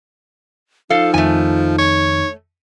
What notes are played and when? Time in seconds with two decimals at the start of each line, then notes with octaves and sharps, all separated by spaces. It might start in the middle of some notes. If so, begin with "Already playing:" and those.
0.90 F3 D#4 A4 F5
1.14 F2 D#3 A3 G#5
1.78 C#5